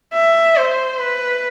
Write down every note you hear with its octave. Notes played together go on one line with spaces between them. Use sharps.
E5
C5
B4